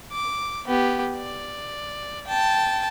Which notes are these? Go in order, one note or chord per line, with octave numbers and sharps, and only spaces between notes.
D6
B3 G4
D5
G5 A5